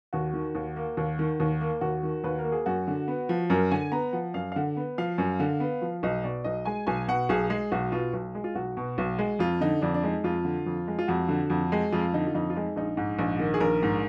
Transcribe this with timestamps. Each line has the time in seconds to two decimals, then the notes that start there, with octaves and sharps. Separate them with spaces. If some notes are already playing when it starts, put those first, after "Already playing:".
0.13 D#2 F#4
0.34 D#3
0.55 D#2
0.76 A#3
0.97 D#2
1.19 D#3
1.40 D#2
1.61 A#3
1.81 D#2 F#4
2.03 D#3
2.24 D#2 B4
2.39 A#4
2.44 A#3
2.52 G#4
2.66 F#2 F#4
2.88 D3
3.08 B3
3.29 F3
3.50 F#2 A#4
3.71 D3 G#5
3.92 B3 A#5
4.13 F3 F#5
4.34 F#2 F5
4.52 F5
4.56 D3 F#5
4.76 B3
4.98 F3 F5
5.18 F#2
5.40 D3
5.60 B3
5.82 F3
6.03 B1 D#5
6.23 B2 D5
6.44 B1 D#5
6.65 G#3 G#5
6.87 B1 G#5
7.08 B2 F#5
7.29 B1 G#4
7.50 G#3 G#4
7.72 B1 F#4
7.92 B2 F4
8.13 B1
8.35 G#3
8.44 F4
8.55 B1 F#4
8.77 B2
8.98 B1
9.19 G#3
9.39 F2 F4
9.61 D3 D#4
9.81 F2 D4
9.94 D4
10.03 G#3 D#4
10.24 F2 F4
10.45 D3
10.66 F2
10.87 G#3
10.99 F4
11.08 F2 F#4
11.29 D3
11.50 F2
11.72 G#3
11.92 F2 F4
12.13 D3 D#4
12.27 F4
12.34 F2 D#4
12.50 F4
12.56 G#3 D#4
12.76 A#1 D#4
12.97 G#2
13.19 A#1
13.39 D#3
13.54 G#4
13.60 A#1 A#4
13.83 G#2